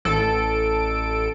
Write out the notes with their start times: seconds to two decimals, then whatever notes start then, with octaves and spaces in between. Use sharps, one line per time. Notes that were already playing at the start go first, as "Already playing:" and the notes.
0.05 A1 A4 D7